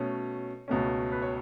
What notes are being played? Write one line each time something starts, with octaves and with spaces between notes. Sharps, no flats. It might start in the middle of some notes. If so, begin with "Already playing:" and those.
Already playing: B2 A3 C#4 C#5
C#2 B2 A3 C#4
B4
C#5